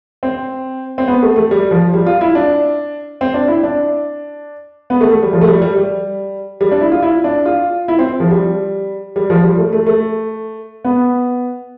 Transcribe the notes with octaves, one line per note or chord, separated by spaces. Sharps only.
C4
C4
B3
A3
A3
G3
F3
G3
F4
E4
D4
C4
D4
E4
D4
B3
A3
A3
G3
F3
A3
G3
G3
G3
G3
D4
E4
F4
E4
D4
F4
E4
C4
F3
G3
G3
F3
G3
A3
A3
A3
B3